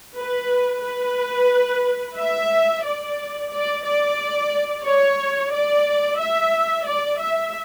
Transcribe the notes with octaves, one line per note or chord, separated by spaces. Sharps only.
B4
B4
E5
D5
D5
D5
C#5
D5
E5
D5
E5